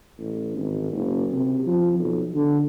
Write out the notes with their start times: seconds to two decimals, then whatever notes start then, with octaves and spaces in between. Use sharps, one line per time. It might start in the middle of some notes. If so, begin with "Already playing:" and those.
0.18 A1
0.56 G#1
0.92 F#1
1.31 C3
1.67 F3
1.99 B1
2.34 D3